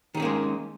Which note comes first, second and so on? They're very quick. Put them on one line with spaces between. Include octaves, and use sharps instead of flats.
D#3 G#4 C#4 A#3 G#3